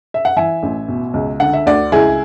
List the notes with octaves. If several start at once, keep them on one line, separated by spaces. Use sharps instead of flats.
E5
F#5
E3 E5 G#5
A1
B2
C#2
D3 F#5
E5
D2 D5 F#5
C#2 E4 G#4